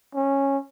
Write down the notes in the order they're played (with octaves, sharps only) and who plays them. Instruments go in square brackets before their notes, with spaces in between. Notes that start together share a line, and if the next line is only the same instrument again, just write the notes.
[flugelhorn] C#4